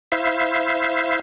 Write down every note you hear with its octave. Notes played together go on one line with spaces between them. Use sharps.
E4 C5 E5 F5